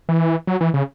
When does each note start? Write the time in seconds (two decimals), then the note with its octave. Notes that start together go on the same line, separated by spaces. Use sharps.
0.09 E3
0.47 F#3
0.61 E3
0.74 C#3